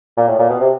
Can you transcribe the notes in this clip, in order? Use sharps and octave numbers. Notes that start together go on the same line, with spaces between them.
A#2
A2
A#2
B2
C3